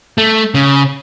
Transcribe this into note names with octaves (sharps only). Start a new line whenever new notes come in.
A3
C#3